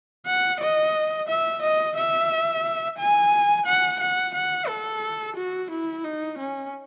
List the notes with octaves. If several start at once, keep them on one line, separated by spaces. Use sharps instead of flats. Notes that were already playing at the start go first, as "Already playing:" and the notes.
F#5
D#5
E5
D#5
E5
G#5
F#5
F#5
F#5
A4
F#4
E4
D#4
C#4